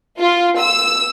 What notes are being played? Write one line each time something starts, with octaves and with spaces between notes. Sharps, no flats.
F4
E6